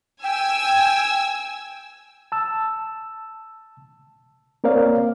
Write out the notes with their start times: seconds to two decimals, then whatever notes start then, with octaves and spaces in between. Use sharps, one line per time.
0.24 G5 G#5 E6
2.32 A5 E6
4.64 A#3 C4 A#4 C#5 D5 F5